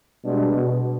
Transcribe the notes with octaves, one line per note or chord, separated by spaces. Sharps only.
B2 G3 G#3 D4
B2